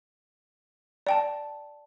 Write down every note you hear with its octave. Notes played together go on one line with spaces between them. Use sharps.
D5 G5 A5